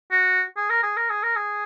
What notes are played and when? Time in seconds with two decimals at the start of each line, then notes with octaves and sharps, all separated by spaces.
0.12 F#4
0.57 G#4
0.70 A#4
0.83 G#4
0.97 A#4
1.10 G#4
1.23 A#4
1.36 G#4